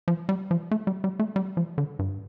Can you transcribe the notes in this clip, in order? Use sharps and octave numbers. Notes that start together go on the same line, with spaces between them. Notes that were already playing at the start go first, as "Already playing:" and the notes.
F3
G3
F3
A3
G3
G3
A3
G3
F3
D3
G2